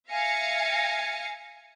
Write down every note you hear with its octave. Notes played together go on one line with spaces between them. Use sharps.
E5 F5 G#5 A#6 C#7